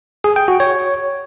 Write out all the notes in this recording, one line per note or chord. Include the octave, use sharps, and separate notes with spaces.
G#4
G5
F#4
C#5